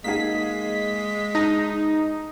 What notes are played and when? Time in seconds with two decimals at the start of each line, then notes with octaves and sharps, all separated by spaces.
0.04 G#3 A#3 D#4 G#4 B6
1.35 D#4 A#5 D#6 A#6